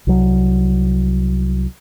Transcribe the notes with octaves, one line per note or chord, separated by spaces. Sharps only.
C2 F#3